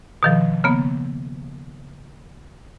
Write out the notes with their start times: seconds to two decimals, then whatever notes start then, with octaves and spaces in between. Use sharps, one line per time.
0.23 B2 D#3 F3
0.64 C#3 A#3 B3